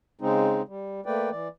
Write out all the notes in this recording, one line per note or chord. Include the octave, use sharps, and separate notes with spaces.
C#3 G#3 C4 D#4
G3
A3 A#3 B4 D5 G5
E3 D5